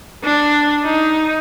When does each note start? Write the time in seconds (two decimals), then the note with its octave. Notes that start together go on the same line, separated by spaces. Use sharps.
0.24 D4
0.84 D#4